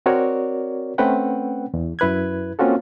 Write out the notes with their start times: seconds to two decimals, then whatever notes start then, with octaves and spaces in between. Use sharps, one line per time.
0.06 C4 F#4 A#4 C#5 D5
0.98 A3 C4 C#4 B4 F#5 G5
1.74 E2
1.99 F#2 E4 B4 F#6 G#6
2.59 A#3 C4 C#4 F4 F#4 A4